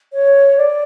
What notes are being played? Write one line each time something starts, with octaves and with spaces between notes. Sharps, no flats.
C#5
D5